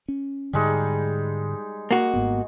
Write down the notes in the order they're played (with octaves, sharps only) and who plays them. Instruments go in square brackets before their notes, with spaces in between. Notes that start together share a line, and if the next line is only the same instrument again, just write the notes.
[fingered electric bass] C#4
[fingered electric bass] G#2 D3 [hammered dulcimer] G3 G#3 D#4
[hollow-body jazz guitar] A#3 F#4
[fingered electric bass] G#1 G#2 B3